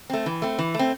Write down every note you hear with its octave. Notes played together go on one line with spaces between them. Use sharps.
A3 C4
E3
A3 C4
E3
A3 C4